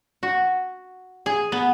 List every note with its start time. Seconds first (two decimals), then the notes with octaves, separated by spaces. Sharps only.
0.23 F#4
1.26 G#4
1.52 B3